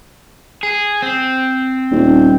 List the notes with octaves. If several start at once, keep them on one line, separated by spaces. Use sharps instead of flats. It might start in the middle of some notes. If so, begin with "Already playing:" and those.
G#4
C4
D#1